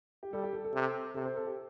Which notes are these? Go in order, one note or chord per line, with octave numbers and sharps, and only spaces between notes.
G4
G3 A4
G4
A4
A4
C3
C3 A4
C5
A4
G4